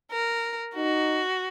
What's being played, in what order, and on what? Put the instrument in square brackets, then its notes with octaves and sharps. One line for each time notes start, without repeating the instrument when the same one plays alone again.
[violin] A#4
[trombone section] D#4 [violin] F#4